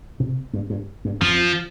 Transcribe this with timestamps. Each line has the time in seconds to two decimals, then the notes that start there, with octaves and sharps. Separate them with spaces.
0.20 C3
0.53 G2
0.70 G2
1.05 G2
1.21 F2 F3